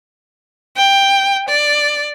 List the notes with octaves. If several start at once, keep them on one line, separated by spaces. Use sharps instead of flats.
G5
D5